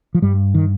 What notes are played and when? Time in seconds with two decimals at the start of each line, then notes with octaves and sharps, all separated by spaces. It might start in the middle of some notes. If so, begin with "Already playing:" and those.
0.15 F3
0.22 G2 G3
0.54 D#3